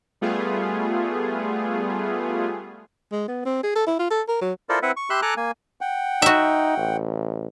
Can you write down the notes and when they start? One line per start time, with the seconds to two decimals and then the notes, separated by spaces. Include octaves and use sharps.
0.21 G3 A3 B3 F4 G#4
3.12 G#3
3.28 B3
3.46 C4
3.63 G#4
3.76 A4
3.87 E4
3.99 F4
4.11 A4
4.28 A#4
4.42 F#3
4.69 E4 F4 A4 A#4 C5 D5
4.83 C4 E4 B4 E5 F#5
4.97 C#6
5.10 G4 E5 B5 C6 E6 F#6
5.22 A4 G#5 A#5 D6 F#6
5.37 A#3 G#5
5.81 F#5 G5
6.22 D#4 F#4 E5
6.78 A1